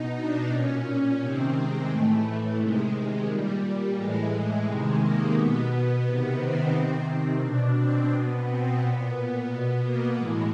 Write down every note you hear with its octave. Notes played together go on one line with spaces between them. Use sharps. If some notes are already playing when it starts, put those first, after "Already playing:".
Already playing: B2 D#4
D4
A#2 C#4
C3 D#3 C4
G#3
A2 E3 A3
A3
C3 D#3 G#3
A#2 G3
A2 E3 G#3
C3 D#3
A#3
B2 B3
C3 D#3
C4
C3 D#3
C4
B2 D4
C4
B2 B3
C4
A#2 B3
B3
B2
A#3
A2 E3 G#3